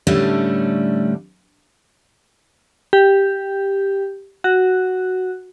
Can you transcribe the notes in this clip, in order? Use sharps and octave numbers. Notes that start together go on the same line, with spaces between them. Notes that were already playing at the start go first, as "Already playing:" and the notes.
A2 D3 G3 A3 C#4 D4
G4
F#4